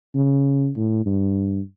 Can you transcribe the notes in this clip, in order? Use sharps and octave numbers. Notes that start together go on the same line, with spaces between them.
C#3
A2
G2